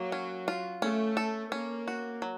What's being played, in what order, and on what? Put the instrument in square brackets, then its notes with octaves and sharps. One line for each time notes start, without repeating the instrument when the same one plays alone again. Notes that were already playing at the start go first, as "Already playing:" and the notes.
Already playing: [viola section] F#3 [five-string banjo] A#3
[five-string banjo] C#4
F4
[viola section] A3 [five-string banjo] C#4
[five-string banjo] A4
[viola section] A#3 [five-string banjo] C#4
[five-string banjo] F#4
F#3